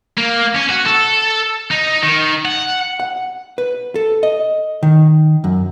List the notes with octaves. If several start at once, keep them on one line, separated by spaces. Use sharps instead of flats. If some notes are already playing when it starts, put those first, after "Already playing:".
A#3
C#4
F#4
A4
D#4
D#3
F#5
F#5
B4
A4
D#5
D#3
F#2